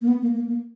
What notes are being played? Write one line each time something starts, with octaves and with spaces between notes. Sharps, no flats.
A#3
B3
A#3
A#3
A#3